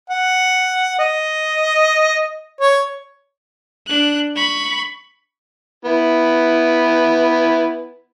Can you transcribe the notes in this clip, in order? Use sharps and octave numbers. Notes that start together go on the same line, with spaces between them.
F#5
D#5
C#5
D4 F#6
B5 C#6
B3 E4